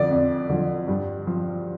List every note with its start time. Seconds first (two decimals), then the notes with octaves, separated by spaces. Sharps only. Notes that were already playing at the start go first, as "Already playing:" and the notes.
Already playing: F2 D3 F3 D5
0.11 F2
0.49 D3 F3
0.88 G2
1.27 F3